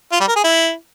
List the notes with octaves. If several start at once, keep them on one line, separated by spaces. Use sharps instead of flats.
F4
G3
A#4
G#4
E4